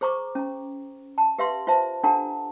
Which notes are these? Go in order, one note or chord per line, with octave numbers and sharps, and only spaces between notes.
G#4 C5 A#5 C#6 D6
C#4 A#5
A5
G4 B4 E5 F5 C6
F4 C5 E5 A5
D4 G4 A4 F#5 A5 A#5